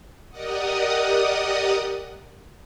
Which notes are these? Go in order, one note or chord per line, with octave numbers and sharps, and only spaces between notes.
G4 A#4 D5 D#5 F#5 D#6